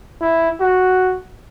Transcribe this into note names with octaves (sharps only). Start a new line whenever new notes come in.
E4
F#4